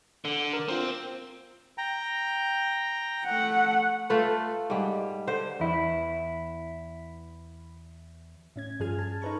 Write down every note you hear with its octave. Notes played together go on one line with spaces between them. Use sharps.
D3
A#4
C4 F4 A#4
G5 A#5
A3 F#5
A3 F4 A4 B4
G#2 G3
D3 C5
E2 E4
A2 C#4 G#6
G2 F3 G#4 F6 G#6
A5
D#4 A4 B4 A#5 C#6